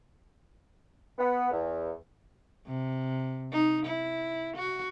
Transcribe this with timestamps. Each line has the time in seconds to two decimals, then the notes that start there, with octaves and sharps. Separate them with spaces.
1.19 B3
1.51 E2
2.66 C3
3.52 D#4
3.86 E4
4.56 F#4